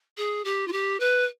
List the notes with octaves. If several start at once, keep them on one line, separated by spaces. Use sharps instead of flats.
G#4
G4
F4
G4
B4